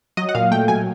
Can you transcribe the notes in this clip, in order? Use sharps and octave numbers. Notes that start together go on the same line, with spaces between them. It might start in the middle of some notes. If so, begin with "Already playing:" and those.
F#3 D#5
F#5
A#2 F5
A3 G5
F#3 G#5